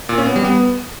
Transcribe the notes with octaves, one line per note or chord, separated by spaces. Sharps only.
A#2
C#4
B3
G3
B3